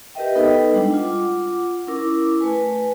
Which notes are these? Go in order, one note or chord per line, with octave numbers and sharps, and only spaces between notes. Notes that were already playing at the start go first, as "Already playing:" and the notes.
G4 A#4 B4 D#5 E5 G5
B3 D#4 A4 B4 D#5 G5
G3 G#3 D4
F4 F#5 D6
C#4 E4 A#4 D6
A3 B4 G#5